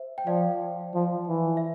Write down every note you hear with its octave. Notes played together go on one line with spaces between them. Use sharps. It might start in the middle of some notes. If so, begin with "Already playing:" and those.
Already playing: C5 E5
G5
F3 D5 F5
F3
E3
E5